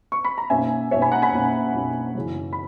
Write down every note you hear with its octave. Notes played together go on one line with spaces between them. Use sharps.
C#6
B5
A#5
B1 B2 A#3 C#4 E5 G#5
B1 B2 A#3 C#4 C#5 E5
G#5 B5
F#5 A#5
G#5 B5
B1 B2 A#3 C#4
B1 B2 A#3 C#4
F#2 C#3 E3
B5